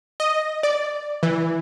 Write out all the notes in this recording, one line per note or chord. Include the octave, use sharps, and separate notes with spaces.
D#5
D5
E3